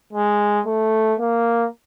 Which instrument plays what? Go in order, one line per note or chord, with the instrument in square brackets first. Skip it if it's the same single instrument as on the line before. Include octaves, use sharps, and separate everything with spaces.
[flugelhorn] G#3
A3
A#3